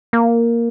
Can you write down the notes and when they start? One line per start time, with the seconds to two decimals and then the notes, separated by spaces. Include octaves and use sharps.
0.13 A#3